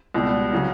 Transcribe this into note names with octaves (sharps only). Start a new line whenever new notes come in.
C#2 B2 G3
C#3 F#3